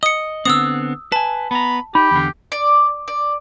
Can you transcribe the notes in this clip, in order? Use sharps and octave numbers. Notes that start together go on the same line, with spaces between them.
D#5 D#6 C#7
D3 B3 C4 D#6 E6
B4 G#5 A5
B3 A#5 B5
D#4 G4 B5
E2 D3
D5
D5